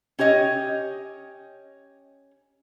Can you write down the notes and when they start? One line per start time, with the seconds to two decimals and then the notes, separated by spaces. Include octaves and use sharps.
0.19 C#4 G4 C#5 D#5